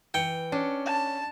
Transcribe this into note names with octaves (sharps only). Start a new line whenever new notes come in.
E3 G5 C#7
C#4 D4
A5